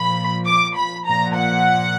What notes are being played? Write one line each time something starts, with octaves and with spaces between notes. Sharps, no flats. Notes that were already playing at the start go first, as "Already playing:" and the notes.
Already playing: A#2 F3 B5
D6
B5
A#2 F3 A#5
F#5